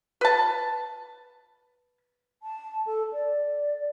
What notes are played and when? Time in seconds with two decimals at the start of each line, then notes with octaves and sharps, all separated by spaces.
0.21 B4 A5
2.43 A5
2.86 A4
3.13 D5